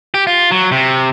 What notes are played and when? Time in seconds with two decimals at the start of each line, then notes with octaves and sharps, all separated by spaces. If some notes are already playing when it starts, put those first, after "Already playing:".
0.14 G4
0.27 F4
0.51 F#3
0.72 C3